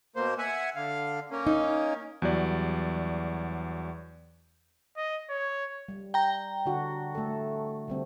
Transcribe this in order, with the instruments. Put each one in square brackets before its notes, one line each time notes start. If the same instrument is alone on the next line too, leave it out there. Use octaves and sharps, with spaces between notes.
[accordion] B2 A#3 C5
E5 F#5 G#5
D3 F5
A#3 C#4
[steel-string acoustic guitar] D#4
[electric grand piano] E2 F#3 G3 D5
[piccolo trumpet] D#5
C#5
[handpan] G3
[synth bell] G5 A#5
[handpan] D3 D4 F#4
A3 A4
D3 G3 C4